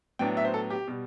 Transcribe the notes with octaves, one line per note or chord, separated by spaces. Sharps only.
A2 F#3 B3 D4 G5
E5
C5
A4
G4
B2 G3